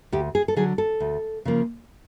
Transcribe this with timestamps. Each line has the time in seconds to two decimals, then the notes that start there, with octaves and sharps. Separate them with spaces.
0.12 D2 G4
0.35 G#4
0.48 A4
0.56 D3 F#3 G#4
0.78 A4
1.00 D2
1.45 C#3 F3 A#3